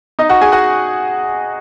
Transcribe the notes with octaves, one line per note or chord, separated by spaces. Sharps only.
D#4 D#5
F#4 F#5
G#4 G#5
F#4 F#5